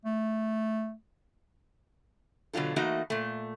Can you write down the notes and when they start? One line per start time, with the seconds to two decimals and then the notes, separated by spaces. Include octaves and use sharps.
0.05 A3
2.53 B2 D3 F#3 F4 A4
2.76 E3 A3 A#3 D#4 F#4
3.10 A#2 A3